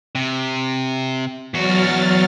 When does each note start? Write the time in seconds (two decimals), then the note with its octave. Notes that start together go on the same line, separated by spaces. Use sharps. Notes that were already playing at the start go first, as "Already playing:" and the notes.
0.15 C3
1.54 E2 F#3 F#4 F6 A6